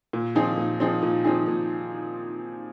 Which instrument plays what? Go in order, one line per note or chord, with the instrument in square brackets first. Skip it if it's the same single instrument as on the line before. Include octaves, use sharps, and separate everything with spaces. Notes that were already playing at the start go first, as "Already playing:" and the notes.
[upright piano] A#2
F3 C4 D#4 G#4
A#2
F3 C4 D#4 G#4
A#2
F3 C4 D#4 G#4
A#2